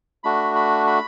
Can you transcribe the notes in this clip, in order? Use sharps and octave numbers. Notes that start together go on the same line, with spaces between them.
A3 D4 F#4 B5
B5
B5